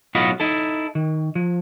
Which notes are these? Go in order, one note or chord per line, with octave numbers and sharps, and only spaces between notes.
B1 A2 F4 F#4 D#5 B5
D#4 E4 A4
D#3
F3